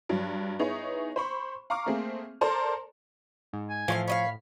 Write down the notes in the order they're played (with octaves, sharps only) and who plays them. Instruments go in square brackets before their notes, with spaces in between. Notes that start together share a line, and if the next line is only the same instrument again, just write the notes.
[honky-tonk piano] G2 F#3
B3 D#4 E4 G#4 C#5
C5 B5 C#6
F5 A#5 C#6 D6 F6
A3 A#3 C4 G#4
A4 A#4 C5 D5 A5 A#5
[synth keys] G#2
[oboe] G#5
[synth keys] A2 [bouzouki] E3 C#5 F5 [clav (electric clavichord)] F3
[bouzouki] C#5 D#5 F5 [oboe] B5